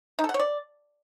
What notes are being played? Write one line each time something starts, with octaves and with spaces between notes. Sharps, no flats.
D#4
A4
F#5
C#5
D5